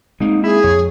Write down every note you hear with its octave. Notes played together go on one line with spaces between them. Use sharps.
G#3 A#3 C4 D#4
E4 G#4
F2 C#5